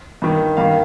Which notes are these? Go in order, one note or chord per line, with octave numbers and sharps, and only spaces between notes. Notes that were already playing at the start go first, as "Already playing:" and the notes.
G2 D#3
G2 D#3 F5